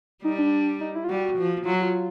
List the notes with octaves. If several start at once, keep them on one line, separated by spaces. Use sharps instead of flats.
G3 D#4
D4
D#4
E4
F4
G3 F#4
F3
F#3 F4
F#4
F4